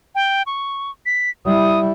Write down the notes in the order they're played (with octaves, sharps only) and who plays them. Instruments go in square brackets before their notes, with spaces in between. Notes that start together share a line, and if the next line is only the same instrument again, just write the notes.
[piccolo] G5
C#6
B6
[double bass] G3 E4 [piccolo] D#6